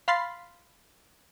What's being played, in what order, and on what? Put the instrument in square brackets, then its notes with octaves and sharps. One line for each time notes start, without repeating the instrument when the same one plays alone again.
[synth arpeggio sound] F5 B5 C6 F6 A6 C7